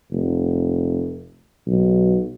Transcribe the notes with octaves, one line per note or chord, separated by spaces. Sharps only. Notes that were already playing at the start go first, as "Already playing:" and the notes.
F1
B1